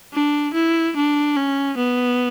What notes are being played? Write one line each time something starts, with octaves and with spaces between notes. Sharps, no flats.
D4
E4
D4
C#4
B3